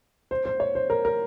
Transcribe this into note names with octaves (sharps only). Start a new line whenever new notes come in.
C5
C5
C#5
C5
A#4
A#4